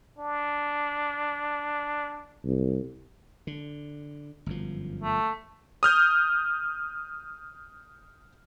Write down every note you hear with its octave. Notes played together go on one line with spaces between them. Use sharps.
D4
C2
D3
G1 F#2 F3
A3
D#6 F6 G6